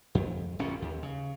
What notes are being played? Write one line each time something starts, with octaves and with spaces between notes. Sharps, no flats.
F2
G1 F#2 A#2 C#4
D#2
C#3